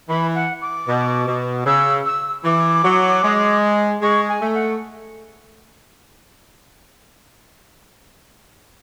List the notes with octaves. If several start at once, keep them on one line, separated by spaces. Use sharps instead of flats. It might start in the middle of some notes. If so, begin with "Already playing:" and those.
E3 B5
F#5
D6
B2
B2
C#3 E6
E6
E3 D6
F#3
G#3
G#3 C#6
G#5
A3
F#5